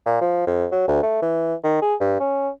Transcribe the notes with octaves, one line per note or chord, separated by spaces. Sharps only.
A#2
F3
F2
F#3
D2
A3
E3
D#3
G#4
G2
C#4